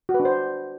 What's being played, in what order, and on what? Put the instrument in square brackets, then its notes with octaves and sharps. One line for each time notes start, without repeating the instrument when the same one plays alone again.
[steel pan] F#4
B4
D4
C5